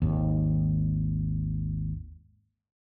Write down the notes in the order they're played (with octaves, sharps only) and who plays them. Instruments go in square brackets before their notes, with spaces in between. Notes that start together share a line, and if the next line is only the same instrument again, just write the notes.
[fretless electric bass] G#1 D#2